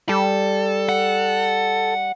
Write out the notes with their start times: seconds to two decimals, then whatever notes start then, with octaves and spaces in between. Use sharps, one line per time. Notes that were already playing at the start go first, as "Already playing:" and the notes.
0.09 G3 A4
0.89 F#5